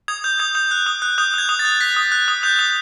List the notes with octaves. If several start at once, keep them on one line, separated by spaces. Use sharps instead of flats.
D#6 G#6
D#6 G6
D#6 G#6
D#6 G6
F#6
D#6
F#6
D#6 G6
D#6 G#6
D#6
A6
F#6
F#6 B6
D#6
F#6
D#6
D#6 G6
D#6